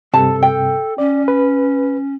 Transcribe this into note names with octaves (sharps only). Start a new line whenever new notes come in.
G2 C3 A4 A5
G5
C#4 D5
B4